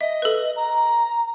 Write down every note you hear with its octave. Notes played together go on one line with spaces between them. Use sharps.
D#5 E5
A4 B4
A#5